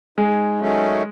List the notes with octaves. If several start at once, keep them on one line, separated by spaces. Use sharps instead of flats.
G#2 G#3
D#3 F#3 A3 C#4